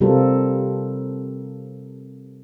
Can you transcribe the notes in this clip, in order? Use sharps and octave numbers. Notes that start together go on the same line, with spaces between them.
C3 G3 C4 F4 A4 A#4